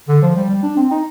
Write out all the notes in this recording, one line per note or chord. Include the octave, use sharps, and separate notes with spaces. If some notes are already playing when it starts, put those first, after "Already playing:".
D3
F3
G3
G3
D4
C4
D#4